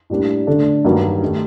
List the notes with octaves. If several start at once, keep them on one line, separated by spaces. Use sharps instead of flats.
A2 G3 A#3 D4
D3 A3 D4 A4
G2 D#3 F#3 A#3 F#4
D#3 A3 D#4 G4